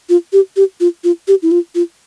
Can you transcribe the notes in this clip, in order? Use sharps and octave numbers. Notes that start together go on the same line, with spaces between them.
F4
G4
G4
F4
F4
G4
E4
F4
F4